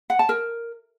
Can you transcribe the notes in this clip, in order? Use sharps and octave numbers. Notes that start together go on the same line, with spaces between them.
F#5
A5
A#4